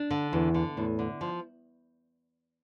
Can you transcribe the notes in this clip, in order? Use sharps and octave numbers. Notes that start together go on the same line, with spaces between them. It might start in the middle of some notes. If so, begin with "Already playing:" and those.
Already playing: D4
D3
E2 E3
D3
E2 A2
D3
F3